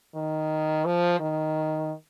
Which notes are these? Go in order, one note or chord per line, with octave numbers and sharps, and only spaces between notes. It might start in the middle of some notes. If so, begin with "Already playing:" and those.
D#3
F3
D#3